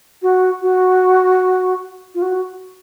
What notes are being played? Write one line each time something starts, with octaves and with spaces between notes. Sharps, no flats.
F#4
F#4
F4
F#4